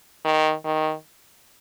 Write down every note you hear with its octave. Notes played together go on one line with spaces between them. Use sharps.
D#3
D#3